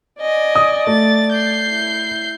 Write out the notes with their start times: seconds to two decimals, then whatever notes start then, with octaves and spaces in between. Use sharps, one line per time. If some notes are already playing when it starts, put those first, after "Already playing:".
0.21 D5 D#5 G#5
0.55 D#6
0.87 A3 A6
1.32 G6 C7
1.68 E4